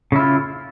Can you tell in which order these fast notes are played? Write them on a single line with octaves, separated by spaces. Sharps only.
C#3 E4 F4